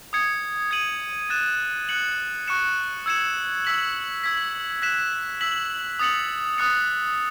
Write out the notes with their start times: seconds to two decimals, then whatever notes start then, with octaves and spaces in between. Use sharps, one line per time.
0.13 D#6 G#6 C#7
0.71 G#6 D#7 F#7
1.30 F#6 A6 E7
1.89 F#6 C#7 F#7
2.48 C#6 F#6 C#7 E7
3.06 E6 G#6 C#7 E7
3.65 E6 B6 F#7
4.23 E6 G#6 B6
4.82 F#6 B6 E7
5.41 E6 B6 F#7
5.99 D#6 A6 C#7 F#7
6.58 D#6 F#6 A6 C#7